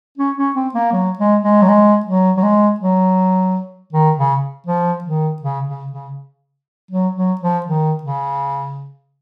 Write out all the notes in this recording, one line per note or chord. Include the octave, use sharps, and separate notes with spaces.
C#4
C#4
C4
A#3
F#3
G#3
G#3
F#3
G#3
F#3
F#3
G#3
F#3
D#3
C#3
F3
D#3
C#3
C#3
C#3
F#3
F#3
F3
D#3
C#3